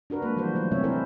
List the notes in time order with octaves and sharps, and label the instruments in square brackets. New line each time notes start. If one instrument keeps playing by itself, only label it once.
[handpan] D4 F#4 A#4 B4
G#3 A#3 B4
E3 F3 G3 F#4 C5
F#3 A3 C5
C3 G3 C4 C#4 C#5 E5
E4 A4 A#4 C5 C#5